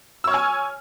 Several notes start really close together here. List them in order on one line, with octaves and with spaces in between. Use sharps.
E6 C#5 F6 G#5